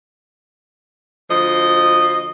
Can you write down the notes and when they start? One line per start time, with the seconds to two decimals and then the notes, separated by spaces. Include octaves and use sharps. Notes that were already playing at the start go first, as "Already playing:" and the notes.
1.29 D2 F3 D#5